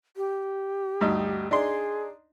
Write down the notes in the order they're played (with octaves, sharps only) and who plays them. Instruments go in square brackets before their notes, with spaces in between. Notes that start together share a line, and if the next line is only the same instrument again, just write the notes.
[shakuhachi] G4
[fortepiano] D2 G2 D#4
[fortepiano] D4 D#4 C6 [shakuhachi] G#4